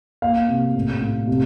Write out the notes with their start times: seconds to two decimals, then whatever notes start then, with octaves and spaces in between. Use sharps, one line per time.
0.22 A#3 F5
0.48 C3
0.75 A2
1.01 A2
1.27 C3